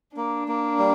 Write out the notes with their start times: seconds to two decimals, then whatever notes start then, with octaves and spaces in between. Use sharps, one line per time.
0.17 A#3 D4
0.48 A#3
0.79 G3